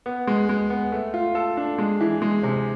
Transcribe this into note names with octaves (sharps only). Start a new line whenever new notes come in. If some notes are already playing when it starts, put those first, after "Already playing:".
B3
G#3
G#3
B3
A3
F4
A4
D4
G#3
E3
G#3
C3